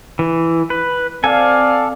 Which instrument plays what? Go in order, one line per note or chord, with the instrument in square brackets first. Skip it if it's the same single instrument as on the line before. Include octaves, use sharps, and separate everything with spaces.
[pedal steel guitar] E3
B4
[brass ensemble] C4 D5 F5 [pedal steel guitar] A4 G#5